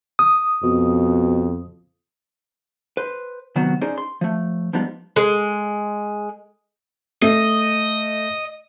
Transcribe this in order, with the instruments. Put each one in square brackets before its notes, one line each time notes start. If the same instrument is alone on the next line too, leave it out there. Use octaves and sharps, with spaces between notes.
[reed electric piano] D#6
[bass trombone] F2 [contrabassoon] B2
[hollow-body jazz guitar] B4 C5
C3 D#3 F#3 B3 F#4
C#4 D#4 G#4 C5 D5
C6
F3 A3
F3 G3 G#3 B3 D#4 F4
[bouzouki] G#3
[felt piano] A3 [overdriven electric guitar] D#5